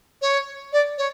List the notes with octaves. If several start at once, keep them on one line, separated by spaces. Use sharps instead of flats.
C#5
D5
C#5